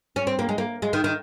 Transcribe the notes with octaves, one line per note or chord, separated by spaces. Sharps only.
C#4
C4
A#3
G#3
A#3
G#3
D#3
D#3